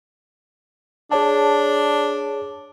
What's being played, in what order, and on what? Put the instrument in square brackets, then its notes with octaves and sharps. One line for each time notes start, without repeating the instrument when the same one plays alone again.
[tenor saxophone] D4 [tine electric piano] G#4 C#5 A5